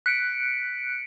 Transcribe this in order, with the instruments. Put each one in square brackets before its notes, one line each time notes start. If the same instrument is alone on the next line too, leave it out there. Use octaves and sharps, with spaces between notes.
[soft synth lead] F#6 [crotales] B6 C#7 D7